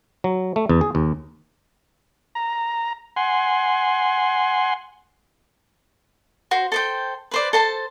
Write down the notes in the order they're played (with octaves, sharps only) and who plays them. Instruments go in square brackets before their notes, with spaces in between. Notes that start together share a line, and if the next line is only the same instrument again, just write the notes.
[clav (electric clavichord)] F#3
A3
E2
G#4
D#2
[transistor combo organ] A#5
F#5 G#5 C6
[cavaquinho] F#4 C5
A4 C5 G5
B4 C5 D5
A4 C5 A5